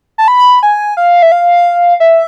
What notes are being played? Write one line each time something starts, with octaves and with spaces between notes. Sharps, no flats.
A5
B5
G#5
F5
E5
F5
E5